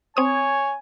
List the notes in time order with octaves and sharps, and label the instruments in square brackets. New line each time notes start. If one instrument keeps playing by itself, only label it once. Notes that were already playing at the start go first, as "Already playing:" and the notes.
[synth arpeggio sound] C4 D#6 [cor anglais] C#5 [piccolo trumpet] G#5